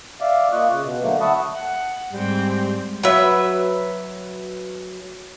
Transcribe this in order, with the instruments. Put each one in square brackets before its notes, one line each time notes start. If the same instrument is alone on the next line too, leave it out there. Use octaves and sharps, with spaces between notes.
[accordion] D5 E5 F5 D6
A#3 F4 D#5 C#6 F#6
C#3
B2
D3 F#3 A3 A#3
E5 F#5 A5 B5 C#6 D#6
[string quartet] F#5
[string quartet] G#2 C4 G5 [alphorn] G3
[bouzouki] F#3 B4 E5